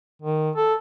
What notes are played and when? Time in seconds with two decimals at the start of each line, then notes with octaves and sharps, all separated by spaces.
0.22 D#3
0.56 A4